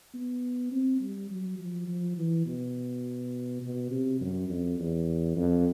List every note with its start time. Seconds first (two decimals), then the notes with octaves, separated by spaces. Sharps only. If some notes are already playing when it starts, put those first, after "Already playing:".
0.14 B3
0.72 C4
1.01 G3
1.30 F#3
1.59 F3
1.87 F3
2.17 E3
2.46 B2
3.62 B2
3.90 C3
4.21 F#2
4.49 F2
4.78 E2
5.36 F2